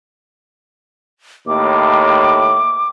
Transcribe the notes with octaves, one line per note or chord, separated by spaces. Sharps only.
D#2 A2 D6